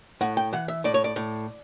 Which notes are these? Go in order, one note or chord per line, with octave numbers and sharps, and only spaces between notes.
A2 F#5
G5
E3 F#5
E5
A2 D5
C#5
D5
A2